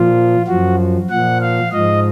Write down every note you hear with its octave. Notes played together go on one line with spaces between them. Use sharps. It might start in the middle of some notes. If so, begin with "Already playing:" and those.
Already playing: A#2 F3 F4
F#2 F3 F#4
A#2 F3 F#5
F5
G#2 F3 D#5